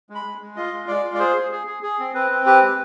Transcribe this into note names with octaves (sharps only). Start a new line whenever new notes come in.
G#3
B5
G#3
G#3
F4 D#5
G#3
G#3 D5
F4
D5
G#4 C5
G#4
G#4
G#4
G#4
C4
C4 B4
C4
G4 B4
G#3